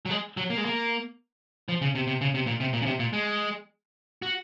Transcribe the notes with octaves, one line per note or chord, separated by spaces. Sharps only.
F#3
G#3
F#3
A#3
G#3
A#3
F3
C#3
C3
C3
C#3
C3
A#2
C3
A#2
C#3
C3
A#2
G#3
F#4